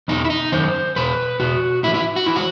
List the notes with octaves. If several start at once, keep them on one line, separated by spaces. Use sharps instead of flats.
E2 B2 D#4
E4
D#4
F#2 D#3 C5
E2 B2 B4
E2 B2 F#4
A2 E3 E4
E4
F#4
E3 E4
F#4